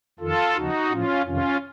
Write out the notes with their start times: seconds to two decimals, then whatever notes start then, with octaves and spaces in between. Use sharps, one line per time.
0.19 F2 D#3 F4 A4
0.55 D#2 C#3 F3 D#4 F#4
0.90 A2 F3 C#4 F4
1.26 F2 C3 D#3 C#4 F4